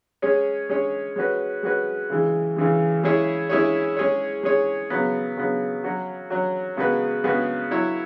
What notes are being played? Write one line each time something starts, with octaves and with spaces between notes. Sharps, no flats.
G#3 C#4 G#4 C#5
G#3 C#4 G#4 C#5
G#3 C#4 F#4 B4
G#3 C#4 F#4 B4
C#3 E3 G#3
C#3 E3 G#3
G#3 C#4 E4 G#4 C#5
G#3 C#4 E4 G#4 C#5
G#3 C#4 G#4 C#5
G#3 C#4 G#4 C#5
C#3 F#3 B3
C#3 F#3 B3
F#3 C#4 F#4
F#3 C#4 F#4
C#3 G#3 B3 F#4 B4
C#3 G#3 B3 F#4 B4
F#3 E4 C#5